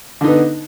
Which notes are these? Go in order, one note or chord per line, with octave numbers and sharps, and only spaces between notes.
D3 B3 D#4